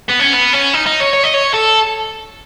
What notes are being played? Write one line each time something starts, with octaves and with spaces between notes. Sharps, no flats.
B3
C#4
B3
C#4
D#4
D#4
C#5
C#5
D#5
C#5
A4